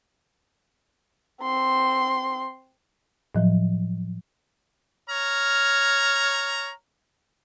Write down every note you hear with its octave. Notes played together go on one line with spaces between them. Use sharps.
C4 C6
A2 F3 F#3
C#5 A#5 F6